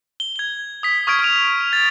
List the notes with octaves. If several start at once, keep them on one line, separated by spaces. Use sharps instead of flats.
G7
G#6 G7
D#6 B6
C#6 D#6 F6 G#6 B6 D7
D#6 F6 G#6 D#7 F7
G#6 A6